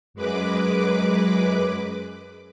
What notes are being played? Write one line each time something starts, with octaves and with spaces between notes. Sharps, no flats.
F#2 G#3 B4 D6